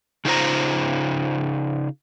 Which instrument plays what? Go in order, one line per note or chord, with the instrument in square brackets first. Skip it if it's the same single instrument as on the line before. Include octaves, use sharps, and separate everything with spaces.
[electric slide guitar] C#3 D#4 F4 C5 A#5